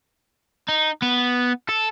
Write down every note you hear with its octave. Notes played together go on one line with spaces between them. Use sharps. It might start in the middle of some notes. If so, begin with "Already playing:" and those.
D#4
B3
A4